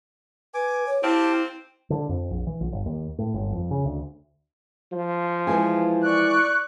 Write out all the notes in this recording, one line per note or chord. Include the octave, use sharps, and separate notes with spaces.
B4 G#5 D6
C#5
C4 E4 G4 F5 A5
D3
F2
A#1
E3
A#1
G1
D#2
A2
G1
F2
C#3
D2
F3
E3 G#3 G#4
D5 C#6 F#6